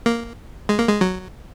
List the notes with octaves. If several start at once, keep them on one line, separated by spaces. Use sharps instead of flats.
A#3
G#3
A#3
G#3
F#3